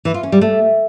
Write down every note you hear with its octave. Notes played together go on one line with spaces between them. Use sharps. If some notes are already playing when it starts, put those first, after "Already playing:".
E3
F4
C#4
G3
A3